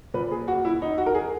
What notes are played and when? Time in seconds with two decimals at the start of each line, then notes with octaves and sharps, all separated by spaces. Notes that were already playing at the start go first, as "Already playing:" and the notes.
0.14 A#2 B4
0.31 G#4
0.48 F#4
0.65 E4
0.82 D#4
0.98 F#4
1.06 A#4
1.15 G#4